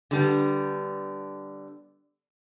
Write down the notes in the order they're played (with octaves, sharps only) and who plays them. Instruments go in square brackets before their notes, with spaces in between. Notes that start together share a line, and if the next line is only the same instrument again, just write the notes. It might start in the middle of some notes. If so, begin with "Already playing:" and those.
[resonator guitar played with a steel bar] D3 G3 B3